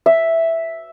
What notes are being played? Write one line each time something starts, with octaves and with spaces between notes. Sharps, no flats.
E5